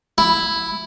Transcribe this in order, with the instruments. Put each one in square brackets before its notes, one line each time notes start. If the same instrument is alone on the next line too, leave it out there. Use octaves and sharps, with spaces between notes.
[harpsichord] E4